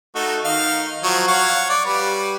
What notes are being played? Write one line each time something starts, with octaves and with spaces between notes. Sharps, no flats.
A3 D#4 F#4
D#3 D#4 F5
F3 F#3 C#5
C#5 F5 F#5
D5
G3 B4